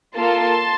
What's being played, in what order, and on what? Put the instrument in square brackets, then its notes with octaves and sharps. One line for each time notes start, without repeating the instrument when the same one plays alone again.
[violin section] A#3 F4 A4 A5 C6